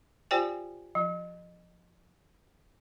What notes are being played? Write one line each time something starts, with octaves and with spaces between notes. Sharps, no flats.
F4 G4 C5 D5 G5 G#5
F3